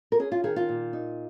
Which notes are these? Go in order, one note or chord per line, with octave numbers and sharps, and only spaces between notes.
A#4
C#4 G#4
F4
D#3 G#4
F4
A#2
D#4